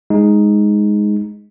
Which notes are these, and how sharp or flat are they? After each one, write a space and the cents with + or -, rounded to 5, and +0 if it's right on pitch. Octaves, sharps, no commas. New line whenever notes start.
G#3 +0 D#4 +0